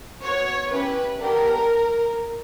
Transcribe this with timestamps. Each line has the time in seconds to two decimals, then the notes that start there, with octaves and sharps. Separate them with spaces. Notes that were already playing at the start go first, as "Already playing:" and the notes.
0.23 B3 F#4 C#5
0.72 C#4 E4 G4 B4
1.20 B3 D4 G4 A#4